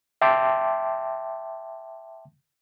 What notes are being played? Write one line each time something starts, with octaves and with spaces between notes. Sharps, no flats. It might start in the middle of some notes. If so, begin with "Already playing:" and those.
E5 G5 A5 C6 D6